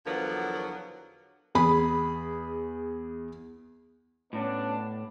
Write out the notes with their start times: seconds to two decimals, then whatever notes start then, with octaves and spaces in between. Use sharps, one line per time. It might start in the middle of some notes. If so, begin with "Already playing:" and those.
0.05 E2 D3 F3 F#3 B3 A#4
1.55 E2 G#4 B5
4.33 A2 B3 C#4 D4